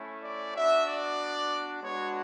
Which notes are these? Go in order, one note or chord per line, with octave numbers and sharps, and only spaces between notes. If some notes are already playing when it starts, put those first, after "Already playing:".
Already playing: A3 C#4 E4
D5
B3 D4 F#4 E5
D5
G#3 B3 D4 F#4 C#5